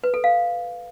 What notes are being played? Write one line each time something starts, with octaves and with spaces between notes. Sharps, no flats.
B4
A4
F5